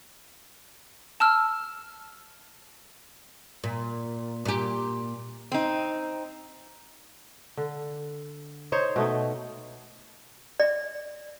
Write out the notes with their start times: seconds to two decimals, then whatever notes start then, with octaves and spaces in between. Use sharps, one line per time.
1.20 A5 E6 F6
3.64 A#2
4.45 A#2 G4
5.52 C4 D#4
7.57 D3
8.72 D#4 C5 C#5
8.96 B2 A3 D#4
10.60 D5